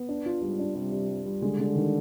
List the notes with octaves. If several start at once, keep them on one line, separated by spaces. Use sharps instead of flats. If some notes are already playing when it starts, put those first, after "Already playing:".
Already playing: B3
D4
F4
G#2 G3
D4
C3 G3
G3
G3
G3
D3 G#3
G#3
D#3